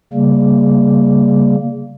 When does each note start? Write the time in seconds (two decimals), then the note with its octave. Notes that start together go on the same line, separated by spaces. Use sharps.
0.13 C#3 G3 A#3